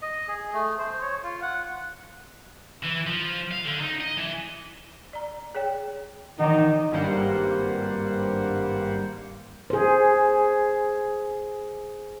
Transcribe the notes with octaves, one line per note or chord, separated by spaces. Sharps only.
D#5
G#4
A3
C5
C#5
F4
F#5
E3
F3
F5
D3
D#4
D#5
E3
D5 A#5
G#4 C#5 G5
D#3 E3 D#4 F#5
G#1 G2 G3 A#3 C5 F#5
G#4 C5